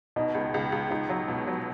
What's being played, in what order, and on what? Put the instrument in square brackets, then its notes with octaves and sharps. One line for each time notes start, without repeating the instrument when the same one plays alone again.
[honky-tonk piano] B2 [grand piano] D#4 D#5
[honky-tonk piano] C#2
C#2
C#2
[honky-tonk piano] C#2 [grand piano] D#4 D#5
[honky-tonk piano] F#3
B2
F#3